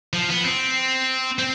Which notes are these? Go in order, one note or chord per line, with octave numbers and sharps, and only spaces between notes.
F3
B3
C4
C4